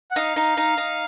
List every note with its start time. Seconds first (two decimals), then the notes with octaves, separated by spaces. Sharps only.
0.11 F#5
0.16 D#4 F5
0.36 D#4
0.57 D#4
0.77 D#4